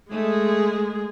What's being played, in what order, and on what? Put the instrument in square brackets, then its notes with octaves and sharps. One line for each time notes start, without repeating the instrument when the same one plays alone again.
[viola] G#3 G#4 [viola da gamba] A3